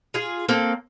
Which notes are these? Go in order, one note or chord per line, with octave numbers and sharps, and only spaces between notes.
F4 G#4
A#3 C4 A4